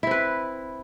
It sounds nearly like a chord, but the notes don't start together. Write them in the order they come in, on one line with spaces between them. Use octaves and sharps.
E4 C4 B4